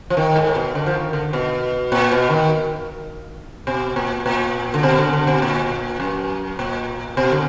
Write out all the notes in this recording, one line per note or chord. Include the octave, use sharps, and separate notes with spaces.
F3
D#3
G#2
B2
D3
F3
D#3
D3
B2
A#2
B2
D#3
B2
A#2
A#2
D3
B2
D3
D3
B2
A#2
F#2
A#2
B2
D3